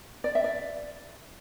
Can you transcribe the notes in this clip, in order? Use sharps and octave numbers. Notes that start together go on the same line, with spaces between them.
D5
E5
D5